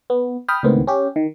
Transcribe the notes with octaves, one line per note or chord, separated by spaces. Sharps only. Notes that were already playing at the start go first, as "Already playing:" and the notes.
B3
G5 B5 D#6 F6
C#2 A2 D#3 B3 C4
C#4 G4
D#3